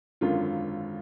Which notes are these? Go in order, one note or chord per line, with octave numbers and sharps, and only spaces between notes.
G#1 F#2 D3 F4